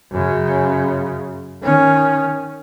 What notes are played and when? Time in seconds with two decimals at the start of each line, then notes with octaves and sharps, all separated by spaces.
0.12 F#2 C#3
1.62 D#3 C#4